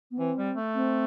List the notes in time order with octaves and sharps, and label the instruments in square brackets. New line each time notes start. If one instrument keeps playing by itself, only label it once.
[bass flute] B3
[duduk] E3 [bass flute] C4
[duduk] G3
A3
[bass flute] C4